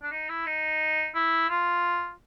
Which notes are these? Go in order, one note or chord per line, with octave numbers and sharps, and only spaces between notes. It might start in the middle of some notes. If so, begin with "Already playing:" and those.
D4
D#4
E4
D#4
E4
F4